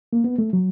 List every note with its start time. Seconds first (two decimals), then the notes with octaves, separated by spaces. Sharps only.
0.13 A#3
0.24 B3
0.38 A3
0.53 F#3